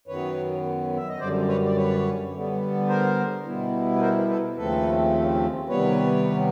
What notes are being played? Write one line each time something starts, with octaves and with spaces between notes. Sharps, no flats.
F#2 D#3 F#3 B3 B4 C#5
E5
D#5
F#2 D3 G3 C5 D5
B4 C#5
D5
B4 C#5
D3 G3 B3
A#4 C5
B2 G3 B3 E4
B4
A#4 C5
A4 B4
D#2 C#3 F3 A3 C4 A4 B4
C3 D#3 G3 B3 B4 C#5